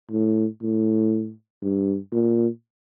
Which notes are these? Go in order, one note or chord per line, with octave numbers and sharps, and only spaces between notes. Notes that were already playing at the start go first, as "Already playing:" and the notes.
A2
A2
G2
A#2